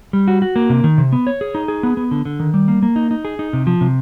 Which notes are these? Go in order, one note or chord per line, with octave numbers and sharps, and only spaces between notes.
G3
F#4
F#4
A#3
C3
D#3
C3
B3
C#5
G#4
D#4
G#4
B3
B3
D3
D3
D#3
G3
A#3
A#3
D#4
D#4
G#4
D#4
C3
F3
C3